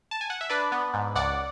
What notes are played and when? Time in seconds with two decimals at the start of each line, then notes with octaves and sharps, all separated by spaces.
0.11 A5
0.21 G#5
0.30 F#5
0.41 E5
0.50 D4 B4 D5
0.72 B3
0.94 G#2
1.15 C#2 D5 F#5